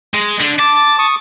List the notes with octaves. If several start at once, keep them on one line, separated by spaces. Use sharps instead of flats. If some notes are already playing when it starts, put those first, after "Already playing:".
G#3
D3 D4
A5 D6
C#6 D#6